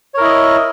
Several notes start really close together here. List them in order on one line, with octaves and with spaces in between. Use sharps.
C#5 A#4 E4 D#5